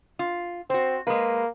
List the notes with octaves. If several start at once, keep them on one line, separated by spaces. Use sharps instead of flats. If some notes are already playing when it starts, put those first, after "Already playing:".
F4
C4 F#4 C5
G#3 A#3 B4